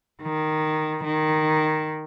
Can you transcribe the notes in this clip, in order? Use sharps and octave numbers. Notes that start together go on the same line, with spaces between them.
D#3
D#3